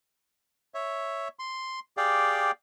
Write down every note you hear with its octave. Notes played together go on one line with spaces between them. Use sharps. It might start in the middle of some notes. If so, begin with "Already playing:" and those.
C#5 E5
C6
G4 G#4 D5 F5 G5